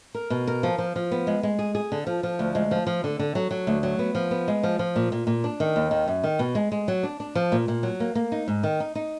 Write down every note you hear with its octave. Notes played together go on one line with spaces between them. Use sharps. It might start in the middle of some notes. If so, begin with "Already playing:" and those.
A#4
B2
A#4
F3
F3
F3
B3
G#3
G#3
G#4
G#4
D3
F3
F3
D2
G#3
F3
F3
D3
D3
F#3
F#3
D2
F#3
B3
F3
B3
G#3
F3
F3
A#2
A#2
A#2
D4
D#3
D#2
D#3
F#2
D#3
B2
G#3
G#3
F#3
D4
D4
F3
A#2
A#2
F#3
A#3
A#3
D#4
G#2
D#3
D#4
D#4